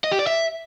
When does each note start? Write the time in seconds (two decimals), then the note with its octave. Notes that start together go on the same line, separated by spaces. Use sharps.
0.04 D#5
0.12 G4
0.19 D5
0.27 E5